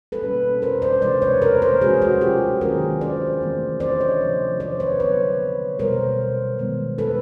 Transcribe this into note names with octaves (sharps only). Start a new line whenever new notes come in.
A4 B4
B2 G3 A#3 C#4
A#4 C5
C5 D5
C3 E3 G#3 C5 D5
B4 C#5
A#4 C5
A#4 C5
F3 G#3 C#4 F#4 G#4
F#4 G#4
F4 G4
D#3 F#3 A#3 C#4 G#4 A#4
C5 D5
E3 A3 C4
C5 D5
C#5 D#5
C3 F3 A3 C4
C5 D5
B4 C#5
D3 F#3 B3 B4 C#5
B2 G3 B3 A#4 C5
D#3 G#3 B3
A4 B4